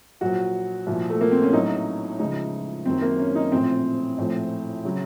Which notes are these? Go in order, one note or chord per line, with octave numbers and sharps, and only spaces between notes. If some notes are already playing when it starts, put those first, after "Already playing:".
A#1 A#2 F#3 F#4
C2 A#2 F3
A3
A#3
C4
C#4
A1 A2 F#3 D#4
C#2 C#3 F3 D#4
F#1 F#2 D#3 F#3 C4
A#3
C#4
D#4
A#1 A2 F3 C4
A#1 A2 F3
C#3 F#3